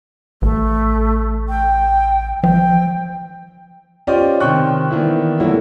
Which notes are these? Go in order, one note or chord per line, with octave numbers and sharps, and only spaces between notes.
A1 A3
G5
F3 G5
C#4 F4 G4 C5 D5 D#5
C3 D#3 C5 G5 C#6 F#6
D#3 E3 A#3 B3 D4 E4
D3 E3 F#3 A3 A#3 E4